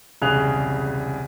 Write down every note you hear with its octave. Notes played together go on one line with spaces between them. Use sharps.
E1 C2 C#3 G#4 F#6 F7